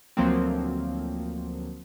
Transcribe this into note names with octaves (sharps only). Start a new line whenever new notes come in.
D2 F3 F#3 A#3 C4